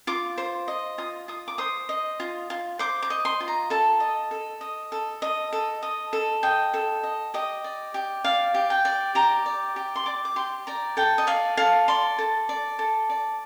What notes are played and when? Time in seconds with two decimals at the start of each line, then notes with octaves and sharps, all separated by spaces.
0.07 F4 D6
0.38 C5
0.68 D#5
0.98 F4 D#6
1.28 F4 D#6
1.48 D6
1.58 C5 D#6
1.89 D#5
2.20 F4
2.50 F4
2.79 C5 D6
3.02 D6
3.10 D#5
3.25 C6
3.40 F4
3.48 A#5
3.70 A4 A5
4.00 D#5
4.31 A4
4.61 D#5
4.92 A4
5.22 D#5
5.53 A4
5.83 D#5
6.13 A4
6.43 D#5 G5
6.74 A4
7.03 D#5
7.34 G4 D#5
7.64 D5
7.94 G4
8.24 D5 F5
8.54 G4
8.70 G5
8.85 D5
9.15 G4 A#5
9.46 D5
9.76 G4
9.96 C6
10.06 D5 D6
10.25 D6
10.36 G4 C6
10.67 D5 A#5
10.97 A4 G5
11.18 D#5
11.27 D5 F5
11.57 A4 F5
11.88 D5 C6
12.18 A4
12.49 D5
12.79 A4
13.10 D5